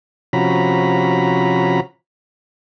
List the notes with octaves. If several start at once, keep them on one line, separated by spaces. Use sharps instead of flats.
C3 F3 C#4 F#4 A#5 B5